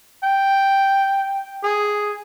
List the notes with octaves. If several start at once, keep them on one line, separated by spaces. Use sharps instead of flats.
G5
G#4